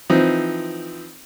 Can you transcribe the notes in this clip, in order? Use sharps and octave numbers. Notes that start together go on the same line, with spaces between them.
E3 F3 C4 D#4